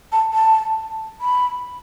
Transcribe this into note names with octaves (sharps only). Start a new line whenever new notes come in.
A5
A5
B5